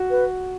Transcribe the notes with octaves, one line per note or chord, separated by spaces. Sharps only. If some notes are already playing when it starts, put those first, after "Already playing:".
Already playing: F#4
B4